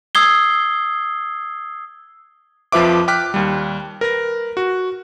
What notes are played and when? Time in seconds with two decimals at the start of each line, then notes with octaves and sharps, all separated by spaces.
0.15 D#6 E6 G#6 C7 G7
2.72 F2 F3 F4 B4 E5 D6
3.08 G5 D6 F6 F#6 B6
3.34 D#2 G3
4.01 A#4 B4 A#6
4.57 F#4